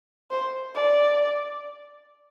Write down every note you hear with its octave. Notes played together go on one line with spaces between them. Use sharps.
C5
D5